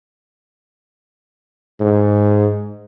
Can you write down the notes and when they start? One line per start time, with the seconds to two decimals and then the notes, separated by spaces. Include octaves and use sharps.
1.80 G#2